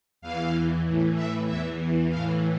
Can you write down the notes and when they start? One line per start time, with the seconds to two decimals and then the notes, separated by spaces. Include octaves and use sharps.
0.22 E2 E3 F5
0.85 A2 E3
1.15 E5
1.47 E2 E3 E5
2.09 A2 E3 F5